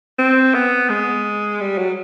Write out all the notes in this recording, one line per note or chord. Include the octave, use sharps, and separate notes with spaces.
C4
B3
G#3
G3
F#3